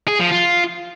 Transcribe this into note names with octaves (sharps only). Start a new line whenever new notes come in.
G#4
F3
F4